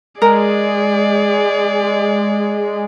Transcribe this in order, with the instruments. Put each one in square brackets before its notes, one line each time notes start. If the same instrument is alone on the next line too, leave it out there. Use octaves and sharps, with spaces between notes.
[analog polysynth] G#3 [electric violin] G#4 D5 [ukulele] A#4